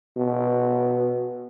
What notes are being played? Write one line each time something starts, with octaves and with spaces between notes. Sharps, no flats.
B2